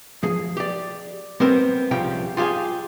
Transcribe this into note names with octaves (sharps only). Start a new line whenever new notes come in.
F3 G#4
G4 D5
G3 B3 C4 A#4 C5
C2 C#3 F3 G3 G5
F4 G4 G#4 F5 G#5